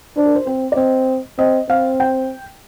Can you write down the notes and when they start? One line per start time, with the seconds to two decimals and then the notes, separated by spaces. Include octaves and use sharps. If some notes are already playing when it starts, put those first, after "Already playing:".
0.17 D4 C5
0.26 A#4
0.35 C5
0.47 C4 C5
0.72 D5
0.77 C4 D#5
1.39 C4 D#5
1.69 C4 F5
2.00 G5